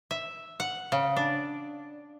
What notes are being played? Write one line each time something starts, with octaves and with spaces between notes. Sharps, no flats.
E5
F#5
C#3
D4